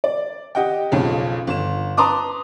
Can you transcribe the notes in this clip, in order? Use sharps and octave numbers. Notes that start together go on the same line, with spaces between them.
D5
G4 D#5 F#5 G5
B1 F2 C#3
G1 E7
B4 A5 A#5 C6 D6 D#6